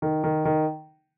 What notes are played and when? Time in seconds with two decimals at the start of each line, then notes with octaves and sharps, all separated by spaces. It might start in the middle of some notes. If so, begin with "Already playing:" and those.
0.02 D#3
0.24 D#3
0.45 D#3